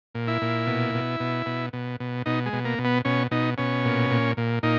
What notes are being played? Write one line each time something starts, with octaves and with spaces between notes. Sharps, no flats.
A#2
E4
A#2
B2
B2
B2
B2
B2
B2
B2 D#4
G#3
B2
A#3
B2
B3
B2 C#4
B2 D#4
B2 C#4
A#2
A#2
A#2
A#2 D#4